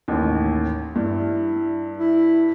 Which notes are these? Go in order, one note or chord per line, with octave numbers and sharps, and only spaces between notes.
A1 D#2
G2 E4
E4